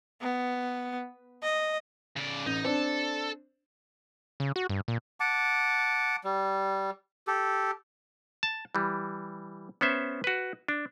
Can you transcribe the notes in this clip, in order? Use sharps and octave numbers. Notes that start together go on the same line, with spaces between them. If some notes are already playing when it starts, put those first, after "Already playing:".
B3
D#5
C#3 D5
A1 D#4
C4 D4 A4
C#3
F#4
G2
A#2
F#5 A5 D6
G3
G4 A4
A5
E3 G3
B3 C#4 C5 E5
F#4 B4
D4